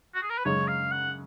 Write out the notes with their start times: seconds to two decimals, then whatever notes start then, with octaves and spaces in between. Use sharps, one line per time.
0.15 F#4
0.22 G#4
0.30 A#4
0.38 B4
0.45 F#2 C#3 G#3 C#4 C#5
0.68 F5
0.91 F#5